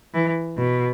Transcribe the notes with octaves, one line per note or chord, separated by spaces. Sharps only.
E3
B2